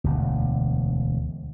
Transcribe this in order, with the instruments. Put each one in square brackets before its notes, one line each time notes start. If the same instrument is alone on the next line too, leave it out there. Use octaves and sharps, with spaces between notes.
[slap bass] E1 D2